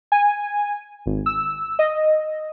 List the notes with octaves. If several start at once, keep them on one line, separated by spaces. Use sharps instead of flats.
G#5
G#1
E6
D#5